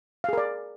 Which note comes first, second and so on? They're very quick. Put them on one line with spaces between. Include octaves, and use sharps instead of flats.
F5 G#4 A#4 D5